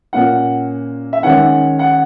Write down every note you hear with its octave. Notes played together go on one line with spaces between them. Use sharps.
A#2 A#3 C#4 F#5
E5
D#3 G#3 C#4 F#5
F#5